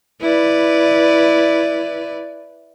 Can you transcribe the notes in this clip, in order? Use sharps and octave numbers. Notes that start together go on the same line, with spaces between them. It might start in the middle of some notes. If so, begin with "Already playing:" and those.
E4 B4 D5